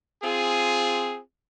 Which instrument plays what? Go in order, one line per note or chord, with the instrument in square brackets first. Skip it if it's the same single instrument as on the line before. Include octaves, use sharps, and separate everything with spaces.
[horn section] C4 F4 G#4